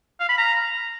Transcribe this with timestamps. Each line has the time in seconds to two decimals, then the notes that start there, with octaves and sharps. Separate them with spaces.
0.20 F5
0.29 B5
0.38 A#5